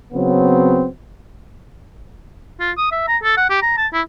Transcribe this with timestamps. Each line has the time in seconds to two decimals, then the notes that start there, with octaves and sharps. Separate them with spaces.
0.13 C#3 F#3 B3 C4
2.60 F4
2.78 D#6
2.92 E5
3.08 A#5
3.23 A4
3.37 F#5
3.50 G4
3.62 A#5
3.77 A5
3.93 E4